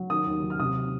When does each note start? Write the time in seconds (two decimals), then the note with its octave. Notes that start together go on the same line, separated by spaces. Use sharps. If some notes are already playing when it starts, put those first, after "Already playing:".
Already playing: F#3
0.10 D#3 D#6
0.27 D#2
0.43 F#3
0.50 F6
0.59 C3 D#6